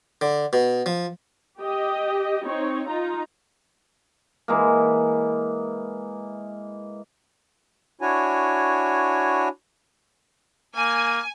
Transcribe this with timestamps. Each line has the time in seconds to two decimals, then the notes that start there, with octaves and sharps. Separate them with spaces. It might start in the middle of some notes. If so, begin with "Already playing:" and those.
0.21 D3
0.53 B2
0.86 F3
1.60 G4 D#5
2.44 C4 D#4 C#5
2.88 D#4 F4 A#5
4.48 E3 G#3 A#3
8.01 D4 E4 F#4 C#5 G#5
10.76 A#3 G#5